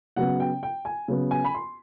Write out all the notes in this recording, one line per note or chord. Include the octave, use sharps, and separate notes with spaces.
C#3 F#3 B3 F#5
G5
G5
G#5
C#3 F#3 B3
G#5
B5
C6